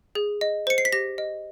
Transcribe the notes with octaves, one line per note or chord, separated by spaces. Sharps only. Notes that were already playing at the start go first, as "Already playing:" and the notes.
G#4
D#5
C5 C#7
C7
B6
G4 A#6
D#5